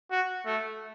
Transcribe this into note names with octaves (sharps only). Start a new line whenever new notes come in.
F#4
A3